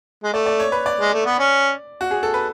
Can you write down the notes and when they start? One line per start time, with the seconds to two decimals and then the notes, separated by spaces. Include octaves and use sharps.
0.24 G#3
0.33 A3 D5
0.46 D5
0.60 C#5
0.72 B4
0.86 D5
1.01 G#3
1.13 A3
1.26 B3
1.39 C#4
2.01 F#4
2.11 G#4
2.23 A4
2.34 B4